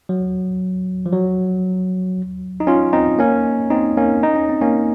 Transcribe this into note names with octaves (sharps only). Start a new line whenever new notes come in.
F#3
F3
F#3
D#4
C#4 F4
C4 D#4
A#3 C#4
C4 D#4
A#3 C#4
D#4
C#4
C4
A#3 C#4